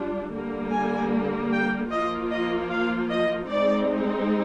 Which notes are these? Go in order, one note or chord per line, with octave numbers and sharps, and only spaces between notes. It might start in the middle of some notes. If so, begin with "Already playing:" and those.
Already playing: G3 D4 F4
D3 G3 A#3
G#5
G5
F3 A#3 F4 D#5
D#5
F5
D#5
G#3 C4 D#4 D5